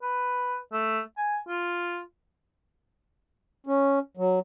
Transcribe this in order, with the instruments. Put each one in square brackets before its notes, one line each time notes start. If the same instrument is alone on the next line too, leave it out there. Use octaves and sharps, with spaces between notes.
[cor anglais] B4
A3
G#5
F4
[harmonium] C#4
F#3